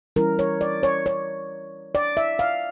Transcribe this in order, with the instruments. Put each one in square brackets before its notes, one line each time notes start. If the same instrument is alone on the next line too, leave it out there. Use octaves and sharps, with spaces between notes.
[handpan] E3 G3 C#4 E4 A#4
C#5
D5
C#5
C#5
D5
E5
F5